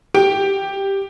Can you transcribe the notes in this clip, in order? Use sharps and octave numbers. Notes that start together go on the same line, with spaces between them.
G4 D7